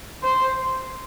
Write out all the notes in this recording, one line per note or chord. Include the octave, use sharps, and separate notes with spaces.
C5